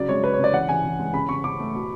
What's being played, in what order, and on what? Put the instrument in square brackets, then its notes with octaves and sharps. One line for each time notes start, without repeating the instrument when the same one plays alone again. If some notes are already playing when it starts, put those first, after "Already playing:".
Already playing: [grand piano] C#3 F#3 [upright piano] D5
[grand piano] G#3 [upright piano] C#5
[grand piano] C#3 [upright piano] B4
[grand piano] C#3 [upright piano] C#5
[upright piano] D5
[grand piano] E3 [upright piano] F#5
[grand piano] E3 [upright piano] G#5
[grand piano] E3
G#3
[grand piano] C#3 [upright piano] B5
[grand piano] C#3 [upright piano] C#6
[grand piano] C#3 [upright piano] D6
[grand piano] A3
B2